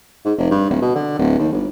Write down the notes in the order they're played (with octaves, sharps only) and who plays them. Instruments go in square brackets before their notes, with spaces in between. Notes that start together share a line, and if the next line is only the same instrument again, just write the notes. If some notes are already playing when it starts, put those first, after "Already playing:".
[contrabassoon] G#2
F1
G2
D1
B2
D3
D1
D#2
G1